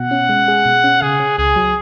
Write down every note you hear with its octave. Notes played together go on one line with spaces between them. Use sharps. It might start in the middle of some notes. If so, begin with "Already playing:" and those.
Already playing: B2 F#5
C#4
G#3
G#4
B2
C#4
C#3 G#4
C#4
C#2 G#4
F#3